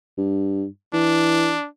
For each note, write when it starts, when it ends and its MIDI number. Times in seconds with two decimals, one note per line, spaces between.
0.17 0.65 43
0.93 1.53 52
0.93 1.67 62